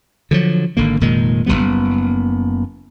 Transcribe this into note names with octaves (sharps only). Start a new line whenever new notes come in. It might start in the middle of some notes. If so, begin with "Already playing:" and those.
D3 F3 F#3
G#1 D3 A#3
F1 A#2 D#3 G#3
F#1 E2 G3 B3